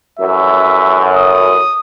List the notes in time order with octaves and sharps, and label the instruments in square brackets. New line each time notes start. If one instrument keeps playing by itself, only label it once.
[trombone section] A1 F#2 [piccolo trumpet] E5
[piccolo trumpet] D#6